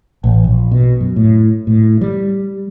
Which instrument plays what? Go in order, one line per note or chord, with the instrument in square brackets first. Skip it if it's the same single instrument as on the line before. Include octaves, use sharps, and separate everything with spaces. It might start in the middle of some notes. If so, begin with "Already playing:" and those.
[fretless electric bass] A1
A#1
B2
F#2
A2
A2
G3